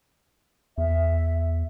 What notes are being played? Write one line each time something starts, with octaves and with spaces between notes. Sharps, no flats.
E2 E5